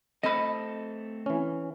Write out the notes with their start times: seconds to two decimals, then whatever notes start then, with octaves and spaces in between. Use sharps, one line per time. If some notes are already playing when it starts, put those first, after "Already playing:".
0.23 A3 C4 A4 D#5 B5
1.26 E3 C#4